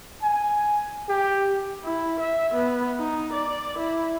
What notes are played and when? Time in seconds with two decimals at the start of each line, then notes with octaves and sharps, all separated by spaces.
0.23 G#5
1.09 G4
1.84 E4
2.20 E5
2.54 B3
2.98 D#4
3.33 D5
3.78 E4